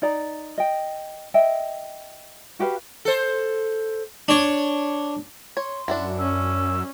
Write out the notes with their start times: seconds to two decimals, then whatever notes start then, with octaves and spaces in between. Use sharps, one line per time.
0.02 D#4 D5 A#5
0.58 D#5 G5
1.34 D#5 E5 G5
2.59 F#4 G4 B4 F5
3.05 A4 C5
4.28 D4 C#5
5.57 C#5 C6
5.88 F#2 D4 E4 F#4
6.19 C#4 E6